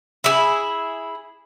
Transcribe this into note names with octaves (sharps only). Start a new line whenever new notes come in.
E4 G4 G#4